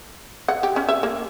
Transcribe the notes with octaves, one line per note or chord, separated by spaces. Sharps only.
F#5
G4
C#4
E5
A#3